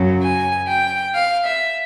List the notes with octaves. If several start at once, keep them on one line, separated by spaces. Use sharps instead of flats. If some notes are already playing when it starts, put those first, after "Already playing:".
Already playing: F#2 C#3 F#3
G#5
G5
F5
E5